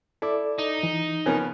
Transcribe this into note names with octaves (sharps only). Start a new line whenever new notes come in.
E4 A4 D5 D6
D#4
E3
C#3 F3 B3 A#4 C#5 G#5